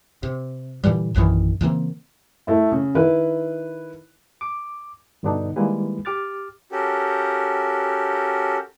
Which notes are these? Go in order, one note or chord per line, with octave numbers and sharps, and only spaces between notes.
C3
A#2 D3 E3 G3
A#1 F#2 D#3 E3
C#3 E3 A#3 C4
A3 E4
C#3
D#3 E4 B4
D6
G2 B2 D3 B3 D4 D#4
D#3 G3 G#3 A#3 E4 B4
G4 D6 F6 A6
C#4 F#4 G4 A4 A#4